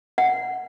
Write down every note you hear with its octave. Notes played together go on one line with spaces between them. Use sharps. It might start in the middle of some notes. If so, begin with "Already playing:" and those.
F#5